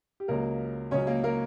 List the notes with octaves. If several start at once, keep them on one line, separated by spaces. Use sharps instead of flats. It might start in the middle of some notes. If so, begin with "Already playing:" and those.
G4
C#2 C#3 F#3 A#3 A#4
C#2 C#3 F#3 C#4 C#5
A#3 A#4
A#3 A#4